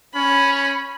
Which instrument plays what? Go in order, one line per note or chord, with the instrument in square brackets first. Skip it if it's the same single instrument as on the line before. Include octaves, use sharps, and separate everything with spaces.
[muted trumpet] C#4 [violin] B5